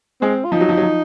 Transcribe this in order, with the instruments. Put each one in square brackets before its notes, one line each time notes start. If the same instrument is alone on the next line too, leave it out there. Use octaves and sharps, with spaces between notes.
[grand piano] G#3 [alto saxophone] C4
[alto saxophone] F4
[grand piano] F3 [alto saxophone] D#4
[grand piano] F#3
F3
F#3
F3